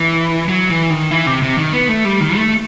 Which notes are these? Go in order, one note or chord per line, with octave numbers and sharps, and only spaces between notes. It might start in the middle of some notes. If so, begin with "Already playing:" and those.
Already playing: E3
F#3
E3
D#3
E3
C3
C3
D#3
B3
A3
G3
D#3
A3